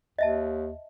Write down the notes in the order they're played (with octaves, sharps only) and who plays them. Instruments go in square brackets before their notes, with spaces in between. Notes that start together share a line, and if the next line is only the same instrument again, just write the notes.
[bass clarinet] D#2 [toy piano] D#5 E5 A5